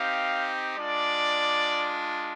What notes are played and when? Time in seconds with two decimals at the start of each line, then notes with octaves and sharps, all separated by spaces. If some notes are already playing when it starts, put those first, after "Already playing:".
Already playing: C4 D#4 G4 F5
0.76 G#3 D4 F4 D5